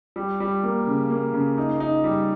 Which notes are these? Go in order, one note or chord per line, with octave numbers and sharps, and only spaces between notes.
G3
G3
A#3
C#3
A#3
C#3
D#4
D#4
G3